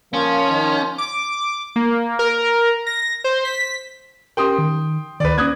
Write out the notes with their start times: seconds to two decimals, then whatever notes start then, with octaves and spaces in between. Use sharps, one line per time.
0.14 F3 A#3 C#4
0.48 D#3
0.98 D6
1.76 A#3
2.19 A#4
2.87 A#6
3.24 C5
3.45 B6
4.37 C#4 G4 A#4 G5 C6 D#6
4.59 D#3
5.20 D2 D#3 B4 D5
5.38 A#3 C#4 D#6 F#6 G#6